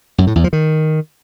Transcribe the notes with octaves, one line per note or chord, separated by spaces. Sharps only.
F#2
A2
E2
F3
D#3